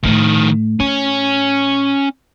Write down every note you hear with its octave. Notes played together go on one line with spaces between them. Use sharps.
A2 D#3 F3 A3
A2 C#4